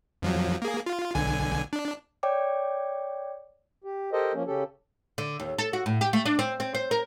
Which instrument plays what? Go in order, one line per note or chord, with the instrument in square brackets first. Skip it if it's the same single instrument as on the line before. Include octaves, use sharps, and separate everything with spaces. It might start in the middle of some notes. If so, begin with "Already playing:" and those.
[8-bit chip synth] F2 F3 F#3
A#3 G#4
F4
B1 D3 G#5
D4
[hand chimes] C#5 D5 G5 D6
[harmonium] G4
G4 A4 A#4 C5 D#5
F3 A#3 C#4
C#3 C#4 G4 A4
[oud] D3
D#2
A4
F#4
A2
G4
A3
D4
C4
C4
C5
A#4